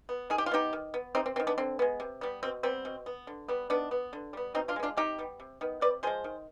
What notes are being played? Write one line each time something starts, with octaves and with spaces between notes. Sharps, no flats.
B3
D#3 G#4
G4
F4
B3 D#4 G4
D#3
B3
C3 C4 D#4
C4
B3 C4
D#3
B3 D4
D3 C4
G#3 B3
C3
G3 B3
B2 C4
G3 B3 C4
B2
B3
D3
G3 B3
D#3 B3 D4
B3
D3
G3 B3
B2 C4 D#4
D4 F4
G#3 B3
D4 F4
C3 D#4 G4
G3 B3
C3
D#3 B3
C3 B4 D5
F3 G#3 G#4 C5
D#3